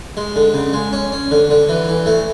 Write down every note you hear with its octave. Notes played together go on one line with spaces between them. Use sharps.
G#3
D3
C#3
G#3
C#4
C#4
D3
D3
E3
E3
A3